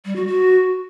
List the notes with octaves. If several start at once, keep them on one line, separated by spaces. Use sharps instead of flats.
G3
F#4
F#4